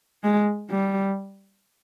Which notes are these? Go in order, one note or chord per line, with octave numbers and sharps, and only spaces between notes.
G#3
G3